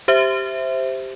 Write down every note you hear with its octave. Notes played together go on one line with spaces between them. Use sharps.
G4 C5 E5